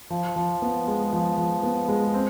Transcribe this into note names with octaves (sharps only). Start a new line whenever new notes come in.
F3
F3
B3
G#3
F3
F3
B3
G#3
C4